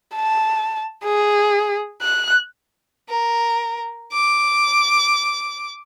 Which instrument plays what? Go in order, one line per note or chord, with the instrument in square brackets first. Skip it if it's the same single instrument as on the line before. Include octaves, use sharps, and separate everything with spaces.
[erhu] A5
G#4
F#6
[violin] A#4
D6